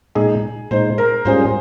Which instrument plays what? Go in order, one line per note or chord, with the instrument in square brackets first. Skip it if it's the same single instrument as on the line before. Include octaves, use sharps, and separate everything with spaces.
[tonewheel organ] A#2 G#3 D#4 [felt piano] G#4
[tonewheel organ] A#2 G#3 D#4 [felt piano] C5
[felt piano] A#4
[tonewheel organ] G#2 G3 C#4 F4 G#4 [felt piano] C5